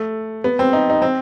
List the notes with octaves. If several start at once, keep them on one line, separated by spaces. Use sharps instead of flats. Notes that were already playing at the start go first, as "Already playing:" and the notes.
Already playing: A3
B3
C4
D#4
D#4
C4